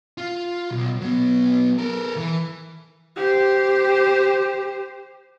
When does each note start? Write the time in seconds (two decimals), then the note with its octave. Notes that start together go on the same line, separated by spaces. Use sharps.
0.18 F4
0.71 B1
1.01 F#3 B3
1.78 A4 A#4
2.16 E3
3.16 G4 C5